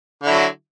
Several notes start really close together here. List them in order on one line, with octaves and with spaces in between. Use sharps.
D3 E4 F#3